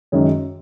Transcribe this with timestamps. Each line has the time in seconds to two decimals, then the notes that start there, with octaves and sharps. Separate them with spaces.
0.12 F#2 D#3 G#3 C#4